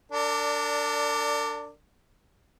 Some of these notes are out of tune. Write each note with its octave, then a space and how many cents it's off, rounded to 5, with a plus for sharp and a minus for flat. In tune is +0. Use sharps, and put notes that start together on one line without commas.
D4 -10 A#4 -45 D5 +0